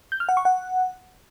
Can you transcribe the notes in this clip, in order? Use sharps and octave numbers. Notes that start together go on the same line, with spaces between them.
G6
F6
F#5
C#6
F#5